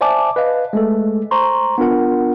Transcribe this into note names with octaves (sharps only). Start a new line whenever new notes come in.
C5 D5 E5 G#5 A5 D6
B4 D#5 F5
G#3 A3 A4
C5 A#5 C6 C#6
B3 D4 F4 A#4 F#5